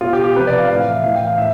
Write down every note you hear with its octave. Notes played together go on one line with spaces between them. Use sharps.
B2 F4
G4
G4
C3 F3 B4
D5
F5
A2 E3 F5
F5
E5
A2 E3 F5
G5
F5
A2 E5